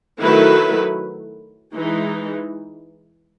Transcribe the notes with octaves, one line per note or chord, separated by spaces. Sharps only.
D#3 F#3 A3 E4 B4
E3 G#3 D#4